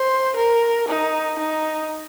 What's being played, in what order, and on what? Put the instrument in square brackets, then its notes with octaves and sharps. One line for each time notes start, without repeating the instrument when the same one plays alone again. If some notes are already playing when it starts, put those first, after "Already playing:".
Already playing: [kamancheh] C5
A#4
D#4
D#4